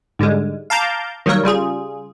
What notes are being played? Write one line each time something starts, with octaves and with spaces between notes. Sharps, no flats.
G#2 D3 G3 G#3
F5 A5 A#5 D6 G6
D#3 F#3 G3 A#3 A#4 C#5
C#3 G3 F4 G#4